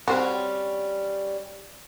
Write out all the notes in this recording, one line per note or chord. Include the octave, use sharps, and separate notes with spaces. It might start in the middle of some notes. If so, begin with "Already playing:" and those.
G3 C4 C#4 F#4